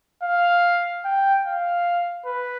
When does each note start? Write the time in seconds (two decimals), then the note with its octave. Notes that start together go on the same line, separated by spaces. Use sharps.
0.23 F5
1.05 G5
1.46 F5
2.26 B4